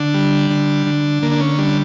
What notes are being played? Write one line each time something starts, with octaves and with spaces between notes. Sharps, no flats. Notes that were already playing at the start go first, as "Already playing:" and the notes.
Already playing: D3 D4
G3
D3
D3
D3 A#3
D4
C#4
G3 D4